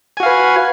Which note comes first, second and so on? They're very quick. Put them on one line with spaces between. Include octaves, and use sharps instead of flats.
G#5 F#4 F5 B4